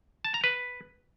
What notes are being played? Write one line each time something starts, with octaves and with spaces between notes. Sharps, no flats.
A5
A#5
B4